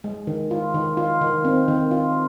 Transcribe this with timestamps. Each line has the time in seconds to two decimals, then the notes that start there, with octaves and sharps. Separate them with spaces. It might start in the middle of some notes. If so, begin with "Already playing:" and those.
0.04 G#3
0.27 D#3
0.51 F4
0.74 D#3
0.97 F4
1.21 D#3
1.45 C4
1.68 D#3
1.91 F4